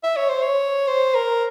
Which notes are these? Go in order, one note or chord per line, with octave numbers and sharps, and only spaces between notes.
E5
C#5
C5
C#5
C5
A#4